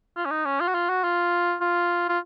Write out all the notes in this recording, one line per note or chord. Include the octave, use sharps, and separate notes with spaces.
F4
C#4
D#4
C#4
F4
F#4
F4
F#4
F4
F4
F4